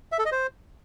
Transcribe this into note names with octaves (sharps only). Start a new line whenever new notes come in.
E5
A4
D#5
C5